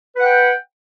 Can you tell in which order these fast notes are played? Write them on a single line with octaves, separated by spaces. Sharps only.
B4 F#5 G5